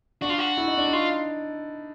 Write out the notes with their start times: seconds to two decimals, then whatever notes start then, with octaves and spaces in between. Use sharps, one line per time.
0.22 D4 F#4
0.29 F4
0.38 F#4
0.57 E4
0.67 D#4
0.77 D4
0.88 D#4
0.93 F4